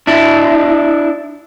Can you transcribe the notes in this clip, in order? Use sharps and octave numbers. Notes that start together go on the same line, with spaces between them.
D4 E4